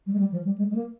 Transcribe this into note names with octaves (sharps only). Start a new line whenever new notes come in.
G3
G#3
G3
F3
G3
G#3
G#3
A#3